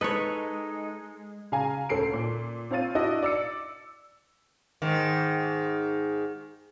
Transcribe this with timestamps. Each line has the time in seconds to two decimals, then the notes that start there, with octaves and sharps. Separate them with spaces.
0.01 G#3 D#4 A4 B4 C#5 D#5
1.52 C#3 F5 G#5 A#5
1.89 D2 C#4 A4 C7 D7
2.13 A#2
2.71 C4 F4 C#5 F5 A6 D#7
2.95 D4 E4 F#4 D#5
3.23 D5 E6 C#7
4.82 G#2 D#3